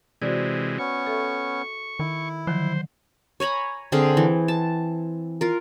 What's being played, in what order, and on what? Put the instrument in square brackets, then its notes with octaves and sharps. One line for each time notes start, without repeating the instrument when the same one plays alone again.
[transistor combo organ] C3 E3 G#3 [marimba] F#4 C5 D5
[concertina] B3 C#4 [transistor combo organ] C#6
[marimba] A4 E5
[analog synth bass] D#3 [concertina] E4
[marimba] D3 D#3 F#3 [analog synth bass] F3 [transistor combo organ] C5
[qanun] C#5 G#5 A#5 B5
D3 C4 G#4 F5
E3
A5
F4 A#4